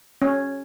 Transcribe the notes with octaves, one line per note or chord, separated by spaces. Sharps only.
C#4